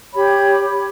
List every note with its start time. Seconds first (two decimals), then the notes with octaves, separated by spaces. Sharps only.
0.13 G4 C#5 B5